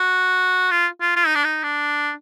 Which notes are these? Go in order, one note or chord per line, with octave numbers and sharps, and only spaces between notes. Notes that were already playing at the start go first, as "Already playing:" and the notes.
Already playing: F#4
F4
F4
F4
D#4
D4
D#4
D4